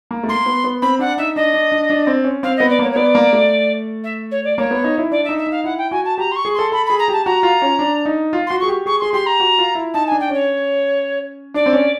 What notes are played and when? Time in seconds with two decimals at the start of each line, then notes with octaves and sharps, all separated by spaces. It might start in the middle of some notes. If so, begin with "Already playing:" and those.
0.11 A#3
0.23 A3
0.28 A#3 C6
0.46 B3
0.64 B3
0.82 C4 B5
0.99 D4 F#5
1.18 D#4 E5
1.36 D4 D#5
1.54 D4
1.72 D4
1.90 D4
2.07 C4
2.24 C#4
2.43 C4 F5
2.57 B3 D#5
2.69 D5
2.79 A#3 C#5
2.92 C#5
2.96 B3 D5
3.15 A#3
3.33 A3
4.04 E5
4.31 C#5
4.44 D5
4.58 A#3 C#5
4.71 B3
4.84 D#4
4.98 E4
5.11 D4 D5
5.24 E5
5.29 D#4
5.38 E5
5.47 D#4 F5
5.64 E4 F#5
5.78 G5
5.91 F#4 G#5
6.05 A5
6.18 G4 A#5
6.31 C6
6.36 C#6
6.45 G#4
6.54 A4 C6
6.72 A4 B5
6.86 G#4 B5
6.99 A#5
7.08 G4 A5
7.26 F#4 A#5
7.43 F4
7.62 C#4
7.79 D4
8.06 D#4
8.33 F4
8.47 F#4 C6
8.60 G#4 C#6
8.68 G4
8.86 G#4 C#6
9.00 G#4 C6
9.13 G4 C6
9.26 A#5
9.40 F#4
9.58 F4
9.75 E4
9.94 D#4 A5
10.07 G#5
10.12 D4
10.20 G5
10.29 C#4 C#5
11.54 D4 D5
11.66 C4
11.73 C#4